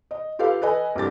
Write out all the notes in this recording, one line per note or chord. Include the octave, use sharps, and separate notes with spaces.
D#5
F4 G4 A4 B4 F5
A4 B4 D#5 G#5
C2 D4 G4 A6